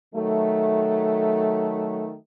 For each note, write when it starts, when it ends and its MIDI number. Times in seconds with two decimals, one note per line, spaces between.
0.14 2.13 51
0.14 2.13 54
0.14 2.13 57